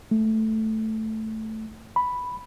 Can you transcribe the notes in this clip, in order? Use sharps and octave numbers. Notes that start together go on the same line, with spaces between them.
A3
B5